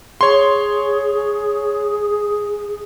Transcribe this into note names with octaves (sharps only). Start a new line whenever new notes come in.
G#4 C#5 C6